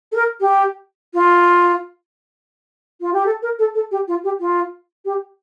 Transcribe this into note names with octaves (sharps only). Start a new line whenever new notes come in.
A4
A#4
G4
F4
F4
G4
A4
A#4
A4
A4
G4
F4
G4
F4
G4